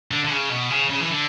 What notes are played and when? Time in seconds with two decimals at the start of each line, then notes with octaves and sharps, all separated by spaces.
0.11 D3
0.25 D3
0.30 C#3
0.50 B2
0.70 C#3
0.90 C#3
1.00 E3
1.10 D3